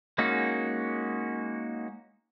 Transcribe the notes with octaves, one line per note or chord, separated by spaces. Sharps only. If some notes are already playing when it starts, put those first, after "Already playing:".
G#3 A#3 C#4 D#4 F#4